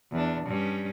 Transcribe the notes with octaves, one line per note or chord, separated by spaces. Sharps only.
E2 D4
G2 G3 C#4